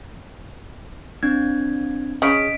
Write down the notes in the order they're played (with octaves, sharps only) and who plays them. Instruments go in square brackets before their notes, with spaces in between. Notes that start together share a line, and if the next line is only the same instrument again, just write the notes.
[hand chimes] C4 D4 G#6
[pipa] C#3 [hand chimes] D#5 B6 D7